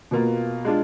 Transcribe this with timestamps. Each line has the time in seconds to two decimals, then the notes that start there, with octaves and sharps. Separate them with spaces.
0.11 B2 A#3 F4
0.65 G#3 D4 F4